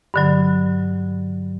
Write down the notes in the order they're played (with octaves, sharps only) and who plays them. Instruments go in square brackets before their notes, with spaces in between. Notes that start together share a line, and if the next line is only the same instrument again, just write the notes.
[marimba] G2 D3 F#3